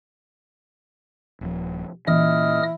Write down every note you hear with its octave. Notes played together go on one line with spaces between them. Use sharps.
D#1 F3
A#2 E3 A#3 C#4 E4 D#5 D#6 F6